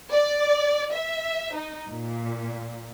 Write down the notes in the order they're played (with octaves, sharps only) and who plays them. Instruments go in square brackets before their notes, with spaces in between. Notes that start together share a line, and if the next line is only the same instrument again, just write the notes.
[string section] D5
E5
D#4
A#2